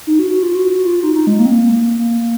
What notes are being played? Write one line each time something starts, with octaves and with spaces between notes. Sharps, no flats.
D#4
F#4
F#4
F4
F#4
F#4
F4
D#4
D#4
G#3
A#3
C4
A#3
A#3